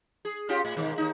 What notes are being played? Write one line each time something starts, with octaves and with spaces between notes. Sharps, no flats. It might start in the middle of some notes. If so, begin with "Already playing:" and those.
G#4
C#4 F4 G4
A2
G#2 B2 D#3
D#2 D#4